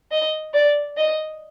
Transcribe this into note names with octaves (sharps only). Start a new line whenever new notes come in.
D#5
D5
D#5